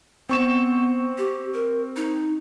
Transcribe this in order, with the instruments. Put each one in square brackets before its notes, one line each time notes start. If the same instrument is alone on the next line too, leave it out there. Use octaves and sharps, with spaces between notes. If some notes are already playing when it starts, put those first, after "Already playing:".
[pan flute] B3 [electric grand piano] C4 C#6 E7
[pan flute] G4
A#4
D#4